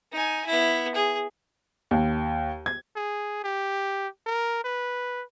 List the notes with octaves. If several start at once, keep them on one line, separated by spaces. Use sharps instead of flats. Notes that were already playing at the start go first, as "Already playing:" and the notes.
D#4 G#5
B3 E4
G#4
D#2
G#6
G#4
G4
A#4
B4